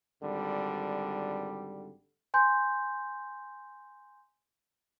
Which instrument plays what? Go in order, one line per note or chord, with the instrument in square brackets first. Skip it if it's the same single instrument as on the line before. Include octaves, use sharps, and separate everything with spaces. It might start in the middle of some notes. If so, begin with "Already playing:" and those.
[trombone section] G#1 D3 G3
[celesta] G#5 C6 G6